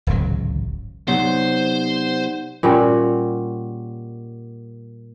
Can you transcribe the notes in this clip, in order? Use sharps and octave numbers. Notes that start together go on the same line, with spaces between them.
D1 G#1 C#2 F#3
C3 F#3 B3 D#4 C5 D5 F#5
A#2 G3 C#4 F#4